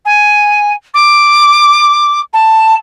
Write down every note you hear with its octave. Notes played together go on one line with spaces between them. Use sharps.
G#5
D6
A5